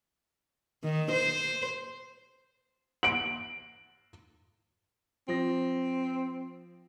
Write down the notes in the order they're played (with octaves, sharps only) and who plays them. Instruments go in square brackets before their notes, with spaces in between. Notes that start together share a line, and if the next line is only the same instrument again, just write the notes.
[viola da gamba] D#3
C5
[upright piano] D7 F#7
[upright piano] F3 A#6 [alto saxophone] C4